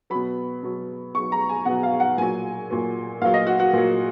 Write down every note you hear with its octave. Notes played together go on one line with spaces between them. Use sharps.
B2 F#3 B5
B2 F#3
B2 F#3 C#6
A#5
G#5
B2 F#3 F#5
F5
F#5
A#2 F#3 G#5
A#2 F#3
A#2 F#3 F5
D#5
F#4
F#4
A#2 F#3